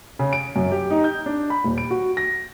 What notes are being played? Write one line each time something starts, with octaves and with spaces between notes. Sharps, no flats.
C#3
D7
F#2
G4
D#4
G6
D4
B5
D#1
D7
F#4
A#6